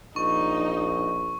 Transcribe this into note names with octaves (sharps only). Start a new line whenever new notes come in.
A#1 D#4 C#6